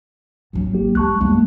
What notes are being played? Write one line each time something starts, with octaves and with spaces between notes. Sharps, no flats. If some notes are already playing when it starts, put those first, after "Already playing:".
G#1 F#3
A#3 G4
G#3 A5 C#6 F#6
F#2 G3 G#3 A#3 B3